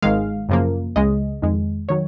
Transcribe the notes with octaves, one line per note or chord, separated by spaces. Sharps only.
G#1 G#2 D#3 G#3 F5
F#2 C#3 F3 A#3
C#2 C#3 G#3 D#5
F2 D#3 G#3
D#3 F#3 C#5